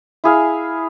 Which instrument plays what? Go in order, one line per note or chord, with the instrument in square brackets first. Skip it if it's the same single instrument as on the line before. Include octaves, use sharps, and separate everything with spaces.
[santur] E4 G#4 F5